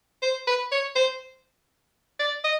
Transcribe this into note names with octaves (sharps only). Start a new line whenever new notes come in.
C5
B4
C#5
C5
D5
D#5